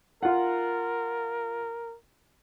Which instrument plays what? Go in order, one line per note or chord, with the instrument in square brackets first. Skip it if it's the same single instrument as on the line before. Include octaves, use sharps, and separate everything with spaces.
[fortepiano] F4 F#5 [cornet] A#4